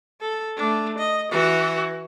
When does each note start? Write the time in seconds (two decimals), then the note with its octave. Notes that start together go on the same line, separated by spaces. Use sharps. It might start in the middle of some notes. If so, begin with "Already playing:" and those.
0.20 A4
0.57 A3 D4
0.98 D#5
1.31 E3 F#4